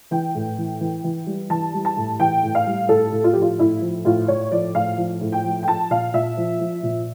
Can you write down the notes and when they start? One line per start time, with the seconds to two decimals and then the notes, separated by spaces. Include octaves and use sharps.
0.11 E3 G5
0.35 A2
0.58 E3
0.80 E3
1.04 E3
1.27 G3
1.50 E3 A5
1.74 G3
1.85 A5
1.97 A2
2.20 E3 G5
2.43 A2
2.55 F5
2.67 G3
2.89 A2 A4
3.12 A2
3.24 F4
3.33 F3 G4
3.42 F4
3.59 A2 E4
3.82 F3
4.05 A2 F4
4.28 A2 C#5
4.51 F3 D5
4.75 A2 F5
4.98 F3
5.21 A2
5.32 G5
5.44 F3
5.63 G5
5.68 F3 A5
5.90 A#2 F5
6.14 A#2 E5
6.37 F3
6.60 F3
6.83 A#2